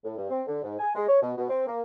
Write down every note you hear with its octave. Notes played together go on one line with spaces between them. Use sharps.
A2
G2
C4
D3
G#2
G#5
G#3
C#5
B2
B2
C4
A#3